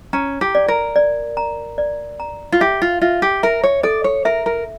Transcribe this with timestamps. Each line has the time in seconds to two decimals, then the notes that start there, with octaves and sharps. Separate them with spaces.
0.13 C#4 A#5
0.41 G4
0.55 D5
0.68 A#4
0.96 D5
1.37 A#5
1.78 D5
2.20 A#5
2.52 F4
2.60 G4 E5
2.82 F4
3.01 F4 E5
3.22 G4
3.43 A#4 E5
3.64 C#5
3.83 A4 D5
4.04 C#5
4.25 A#4 E5
4.46 A#4